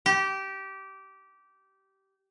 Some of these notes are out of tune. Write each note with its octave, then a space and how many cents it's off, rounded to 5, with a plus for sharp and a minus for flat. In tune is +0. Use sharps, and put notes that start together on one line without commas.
G4 -20